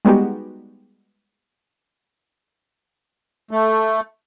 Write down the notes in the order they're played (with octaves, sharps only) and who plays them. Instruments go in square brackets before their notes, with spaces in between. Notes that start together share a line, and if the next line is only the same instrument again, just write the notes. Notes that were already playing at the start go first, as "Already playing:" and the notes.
[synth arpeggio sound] G3 G#3 B3 D#4 F#4 G4
[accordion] A3